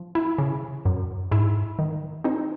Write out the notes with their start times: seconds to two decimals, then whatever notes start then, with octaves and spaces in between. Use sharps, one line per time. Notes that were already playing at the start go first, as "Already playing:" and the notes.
Already playing: F3
0.15 E4
0.38 C#3
0.85 F#2
1.31 G#2 E4
1.79 D#3
2.24 C4 D#4